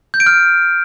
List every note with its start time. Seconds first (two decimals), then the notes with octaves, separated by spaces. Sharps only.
0.14 G6
0.20 D7
0.26 F6